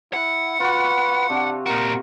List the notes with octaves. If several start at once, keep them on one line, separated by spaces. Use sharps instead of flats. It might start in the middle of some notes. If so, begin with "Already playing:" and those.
E4 F#5
F4 F#4 B4
C3 D4
A#2 F#4 A#4